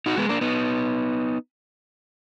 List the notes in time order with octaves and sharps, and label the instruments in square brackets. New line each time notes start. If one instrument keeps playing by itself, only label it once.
[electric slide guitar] D#4 F#4
G#3 B3
A#3 D4
B3 D#4